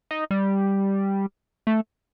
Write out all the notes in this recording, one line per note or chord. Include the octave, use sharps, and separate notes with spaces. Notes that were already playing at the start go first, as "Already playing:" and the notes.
D#4
G3
A3